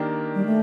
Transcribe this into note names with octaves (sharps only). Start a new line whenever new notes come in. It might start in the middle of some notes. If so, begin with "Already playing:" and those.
Already playing: D#3 A#3 D4 G4 A#4
G3
A3